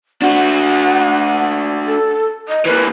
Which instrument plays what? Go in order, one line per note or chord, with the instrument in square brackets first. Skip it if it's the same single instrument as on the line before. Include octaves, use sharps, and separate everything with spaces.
[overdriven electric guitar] D4 F#4 [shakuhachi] F#5
[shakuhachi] A4
D#5
[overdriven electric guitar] E3 A#3 [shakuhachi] B4